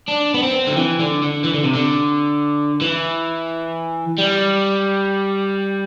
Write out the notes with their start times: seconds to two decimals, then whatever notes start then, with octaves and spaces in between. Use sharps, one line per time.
0.08 D4
0.34 B3
0.43 C4
0.67 D3
0.77 E3
1.00 D3
1.23 D3
1.45 E3
1.54 D3
1.64 C3
1.75 D3
2.81 E3
4.18 G3